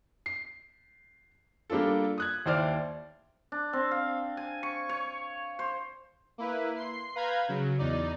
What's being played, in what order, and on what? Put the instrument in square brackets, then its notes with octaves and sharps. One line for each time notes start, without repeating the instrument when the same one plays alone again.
[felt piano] C7
G3 A#3 D4 F4 A4
D#6 F#6 G#6
D#2 E4 C5 D5 D6 F6
[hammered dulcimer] D4
C4
F5
G#5
C#6
C#5
C5
[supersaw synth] A#3 E4 B4
C6 C7
B4 F5 A#5 B5 G6 G#6
C#3 F#3
E2 D#4 D5